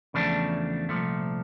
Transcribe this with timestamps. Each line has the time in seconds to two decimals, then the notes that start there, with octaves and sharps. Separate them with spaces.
0.14 E2 C#3 F3 A3 D4
0.89 C2 A#2 F3 A3